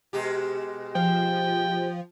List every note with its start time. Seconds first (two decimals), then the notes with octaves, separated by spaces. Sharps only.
0.13 B2 G#3 G4
0.95 F3 G5